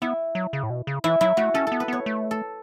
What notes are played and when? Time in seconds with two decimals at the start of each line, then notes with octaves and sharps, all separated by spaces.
0.02 B3 E4
0.35 F#3
0.53 C#3
0.63 A2
0.70 B2
0.87 C#3
1.04 E3 E4
1.21 F#3 E4
1.37 A3 F#4
1.54 C#4 A4
1.67 B3 A4
1.80 B4
1.88 B3 C#5
2.06 A3
2.31 A4